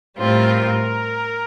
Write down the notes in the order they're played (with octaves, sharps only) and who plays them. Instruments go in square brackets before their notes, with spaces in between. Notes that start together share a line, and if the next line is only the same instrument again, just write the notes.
[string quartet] A2 G3 C4 F4 [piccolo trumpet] A#4